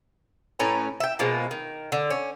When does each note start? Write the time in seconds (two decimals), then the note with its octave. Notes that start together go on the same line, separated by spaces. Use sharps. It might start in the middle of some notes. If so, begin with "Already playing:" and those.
0.59 A2 C#4 B4 A#5
1.00 E5 G5
1.19 B2 F3 G#3 A#3
1.51 D#3
1.92 D3
2.10 C#4